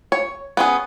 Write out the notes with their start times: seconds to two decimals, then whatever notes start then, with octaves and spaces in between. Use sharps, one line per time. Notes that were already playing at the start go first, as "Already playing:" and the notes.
0.12 C#5
0.57 B3 C#4 G#4